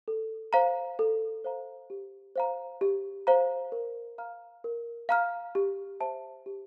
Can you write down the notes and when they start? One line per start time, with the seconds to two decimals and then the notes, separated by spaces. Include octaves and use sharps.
0.08 A4
0.53 C5 F5 A#5
0.99 A4
1.44 C5 F5 A#5
1.90 G4
2.36 C5 F5 A#5
2.81 G4
3.27 C5 F5 A#5
3.72 A#4
4.18 F5 A#5 F6
4.64 A#4
5.09 F5 A#5 F6
5.55 G4
6.00 C5 E5 A5
6.46 G4